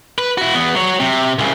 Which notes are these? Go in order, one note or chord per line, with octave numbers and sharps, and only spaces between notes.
B4
E4 F#4
E2 B3
F#3 C#5
C3
C2 C#3